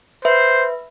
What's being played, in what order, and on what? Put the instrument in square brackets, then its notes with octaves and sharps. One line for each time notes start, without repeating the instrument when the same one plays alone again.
[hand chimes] B4 E5 [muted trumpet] C5